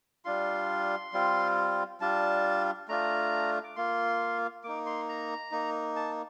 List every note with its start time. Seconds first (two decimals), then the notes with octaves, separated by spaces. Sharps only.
0.25 G3 D4 F4 C6
1.13 G3 C4 F4
2.01 G3 D4 F4 A5
2.88 A3 D4 F4 A#5
3.64 D6
3.76 A#3 F4 C6
4.64 A#3 D#4 D6
4.86 C6
5.09 A#5
5.52 A#3 D#4
5.96 A5